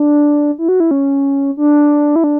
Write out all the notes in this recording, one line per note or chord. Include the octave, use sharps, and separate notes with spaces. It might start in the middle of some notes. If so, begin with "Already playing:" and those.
Already playing: D4
E4
F#4
E4
C#4
D4
E4
D4